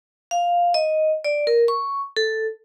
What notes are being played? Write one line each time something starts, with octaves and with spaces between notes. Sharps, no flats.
F5
D#5
D5
A#4
C#6
A4